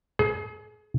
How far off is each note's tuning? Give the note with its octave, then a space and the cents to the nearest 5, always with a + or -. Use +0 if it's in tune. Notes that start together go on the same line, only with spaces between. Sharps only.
G#4 +35